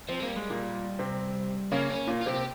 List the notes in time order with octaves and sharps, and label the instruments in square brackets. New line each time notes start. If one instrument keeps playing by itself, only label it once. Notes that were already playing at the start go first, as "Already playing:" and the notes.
[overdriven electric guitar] F3 [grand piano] C4
[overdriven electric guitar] G#3
[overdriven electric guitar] G3 [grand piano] A#3
[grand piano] G#3
A#2 A#3
C3 C4
[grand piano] C#3 C#4 [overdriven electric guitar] A#3
[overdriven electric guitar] C#4
[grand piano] A#2 A#3
[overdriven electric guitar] F4
[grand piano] C3 C4 [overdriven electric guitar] G4